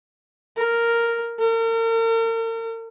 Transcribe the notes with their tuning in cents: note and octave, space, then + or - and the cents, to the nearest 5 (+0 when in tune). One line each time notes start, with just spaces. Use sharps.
A#4 +0
A#4 -40